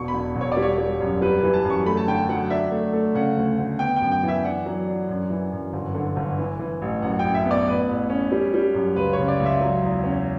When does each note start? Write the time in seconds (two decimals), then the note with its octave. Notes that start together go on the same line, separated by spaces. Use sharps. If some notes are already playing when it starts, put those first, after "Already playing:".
Already playing: E1 B2 C#6
0.08 B5
0.14 E1
0.36 E1
0.41 C#5
0.52 D5
0.57 G3
0.62 C#5
0.78 G3
1.00 F#2
1.21 G3 B4
1.38 E3 B4
1.54 A5
1.65 F#2
1.70 C#6
1.86 A3 B5
1.97 A5
2.07 D3 G5
2.29 F#3 F#5
2.50 D4 E5
2.71 A3
2.93 A3
3.15 C#3 F#5
3.37 D2
3.58 D2
3.79 B3 G5
3.96 F#2 G5
4.12 G5
4.23 E3 E5
4.44 D4 F#5
4.66 F#3
4.87 D4
5.09 F#2
5.30 E3
5.52 F#2
5.73 G1
5.95 D3
6.16 G1
6.38 E3
6.59 E3
6.82 A1
7.02 F#2 F#5
7.19 F#2 G5
7.34 E5
7.45 B3
7.51 D5
7.67 A1 B4
7.89 A1
8.10 C#4
8.32 G3
8.54 G3
8.75 F#2
8.96 C#2 B4
9.13 C#5
9.19 C#3
9.28 D5
9.40 C#2
9.45 E5
9.61 F#3
9.82 E2
10.03 C#4